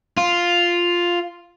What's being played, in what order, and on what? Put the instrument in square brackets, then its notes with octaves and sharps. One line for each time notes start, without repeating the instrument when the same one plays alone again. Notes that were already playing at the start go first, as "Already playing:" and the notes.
[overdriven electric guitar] F4